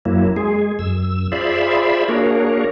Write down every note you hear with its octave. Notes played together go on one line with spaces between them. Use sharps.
F#2 F#3 A#3 E4
G#3 G#4
F#2 E6
F4 G#4 C5 D5 E5 B5
A#3 D4 F#4 G#4 A#4 C#5